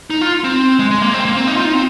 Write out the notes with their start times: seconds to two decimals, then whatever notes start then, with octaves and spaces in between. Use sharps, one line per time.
0.10 D#4
0.21 F4
0.44 C4
0.79 G#3
0.91 G#3
1.02 A#3
1.14 C4
1.25 A#3
1.36 C4
1.48 D#4
1.57 F4
1.65 D#4
1.74 C4